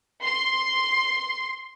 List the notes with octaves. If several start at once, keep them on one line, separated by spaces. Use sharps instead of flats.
C6